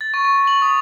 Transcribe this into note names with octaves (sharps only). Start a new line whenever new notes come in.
A6
C#6
C#6
F#7
D#6